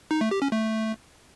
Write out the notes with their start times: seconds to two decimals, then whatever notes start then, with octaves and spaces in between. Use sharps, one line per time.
0.11 D#4
0.21 A3
0.31 G4
0.42 C#4
0.52 A3